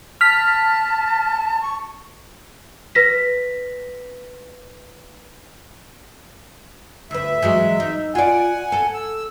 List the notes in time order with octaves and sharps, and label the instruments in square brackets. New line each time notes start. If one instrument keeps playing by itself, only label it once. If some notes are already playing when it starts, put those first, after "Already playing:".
[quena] A5 [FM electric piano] F6 B6
[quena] C#6
[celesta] B4 A#6 B6
[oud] D2 B4 [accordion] E5
[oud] E3 F#3 G#3
D#4
[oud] F4 D5 [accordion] F#5 G#5
[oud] A4
[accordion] E6